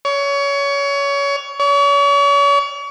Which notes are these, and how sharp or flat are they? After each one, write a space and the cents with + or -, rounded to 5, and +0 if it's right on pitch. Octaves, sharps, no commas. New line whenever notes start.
C#5 +25
C#5 +40